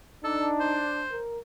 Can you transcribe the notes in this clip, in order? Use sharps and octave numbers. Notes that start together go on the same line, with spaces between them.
D4 D#4 A4
C5
A#4